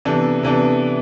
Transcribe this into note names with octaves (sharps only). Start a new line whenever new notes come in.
C3 E3 B3 D4 A4
C3 E3 B3 D4 A4